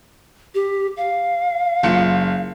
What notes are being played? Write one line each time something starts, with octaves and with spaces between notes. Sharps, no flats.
G4
F5
F#1 F4 C#7